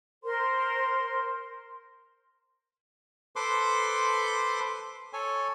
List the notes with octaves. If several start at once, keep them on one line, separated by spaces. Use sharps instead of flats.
A#4 C5 C6
A4 B4 C5 C6 D6
A4 C#5 G#5